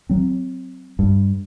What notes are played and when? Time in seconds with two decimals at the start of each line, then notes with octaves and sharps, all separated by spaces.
0.09 F#3 C4
0.99 G2